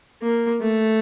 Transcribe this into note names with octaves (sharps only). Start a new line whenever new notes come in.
A#3
A3